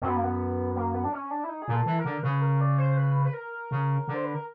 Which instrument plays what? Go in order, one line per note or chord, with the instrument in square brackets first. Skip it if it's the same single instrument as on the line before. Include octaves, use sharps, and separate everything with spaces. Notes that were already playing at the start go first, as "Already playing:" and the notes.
[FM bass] F#2 [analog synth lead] C4
[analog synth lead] B3
A#3
B3
A#3
B3
D4
C#4
D4
E4
D#4
G#4
[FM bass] A#2
[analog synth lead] A4
[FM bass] E3
[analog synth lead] A#4
[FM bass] D3
[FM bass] C#3 [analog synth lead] B4
[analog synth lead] A#4
D5
C5
B4
B4
A#4
[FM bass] C#3
D3
[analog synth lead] C5
B4
A#4